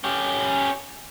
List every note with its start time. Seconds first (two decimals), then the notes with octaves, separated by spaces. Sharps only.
0.04 C#4 G4